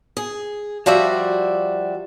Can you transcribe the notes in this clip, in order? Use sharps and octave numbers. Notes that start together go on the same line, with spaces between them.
G#4
F3 G3 F#4 D5 E5